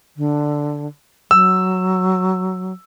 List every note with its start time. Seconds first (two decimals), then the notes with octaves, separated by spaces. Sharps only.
0.17 D3
1.31 F#3 E6